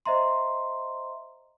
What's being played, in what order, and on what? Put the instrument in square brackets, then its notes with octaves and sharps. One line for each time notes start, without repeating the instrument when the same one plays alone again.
[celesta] C5 D#5 E5 A#5 C6